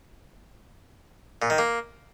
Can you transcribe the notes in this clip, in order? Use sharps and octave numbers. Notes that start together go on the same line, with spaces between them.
A#2
D#3
A#3